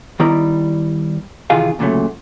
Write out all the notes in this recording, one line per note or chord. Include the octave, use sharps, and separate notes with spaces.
D#3 G3 B3 E4 D5 A#5
C3 D#3 E3 F4 G#4 F5
D2 A#2 C#3 F#3 A3